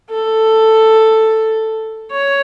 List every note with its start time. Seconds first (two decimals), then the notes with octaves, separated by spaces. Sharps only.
0.11 A4
2.11 C#5